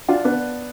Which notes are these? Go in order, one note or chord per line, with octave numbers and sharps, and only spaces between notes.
D4 F4
B3 D4